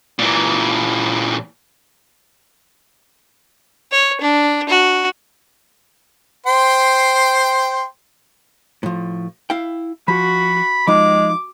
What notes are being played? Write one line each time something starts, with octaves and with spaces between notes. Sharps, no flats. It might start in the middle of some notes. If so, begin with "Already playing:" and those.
A#2 E3
C#5
D4
F#4
C5 G5 C6
A2 F3
E4 F5 G5
F3 F#4 B5
F3 G#3 D#4 D6